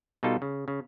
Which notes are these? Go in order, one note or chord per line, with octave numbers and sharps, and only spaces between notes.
B2 G3 D#4 F4 A4
C#3
C#3